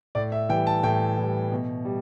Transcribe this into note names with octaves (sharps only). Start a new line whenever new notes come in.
A2 D5
E5
E3 G3 G5
A5
A2 G5
E3 G3
B2
G3